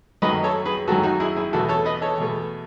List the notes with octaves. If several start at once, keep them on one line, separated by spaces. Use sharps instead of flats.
F#2 D#3 F#3 A3 B4 D#5
A4 C#5
G#4 B4
F#2 D#3 F#3 A3 F#4 A4
D#4 F#4
E4 G#4
E4 G#4
E2 B2 A3 F#4 A4
A4 C#5
B4 D#5
A4 C#5
E2 B2 A3